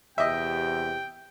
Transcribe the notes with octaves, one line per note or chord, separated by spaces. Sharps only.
E2 C3 G4 D#5 E5 G5